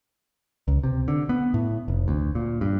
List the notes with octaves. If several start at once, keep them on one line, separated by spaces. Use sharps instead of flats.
C#2
C3
D3
B3
A2
F1
D2
A#2
G2